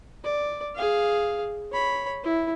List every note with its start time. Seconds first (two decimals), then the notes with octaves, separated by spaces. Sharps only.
0.24 D5
0.75 G#4 F5
1.72 C#5 B5
2.23 E4